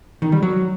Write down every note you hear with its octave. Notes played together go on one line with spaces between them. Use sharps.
D#3
G3
F#3